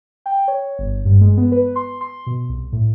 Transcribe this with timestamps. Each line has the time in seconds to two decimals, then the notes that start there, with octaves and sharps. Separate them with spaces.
0.26 G5
0.48 C#5
0.79 G1
1.05 G2
1.21 G#3
1.37 B3
1.52 B4
1.76 C6
2.01 C6
2.27 B2
2.49 C2
2.72 A2